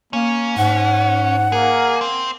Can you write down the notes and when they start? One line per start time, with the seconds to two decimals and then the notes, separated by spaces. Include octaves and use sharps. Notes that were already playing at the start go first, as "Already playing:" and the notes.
0.13 A#3 C#4
0.57 G#2 F#5
1.52 A#3 G#4
2.01 C4